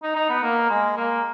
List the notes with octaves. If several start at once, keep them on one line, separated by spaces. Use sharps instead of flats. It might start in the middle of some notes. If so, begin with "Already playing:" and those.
D#4
D#4
B3
A#3
G#3
A#3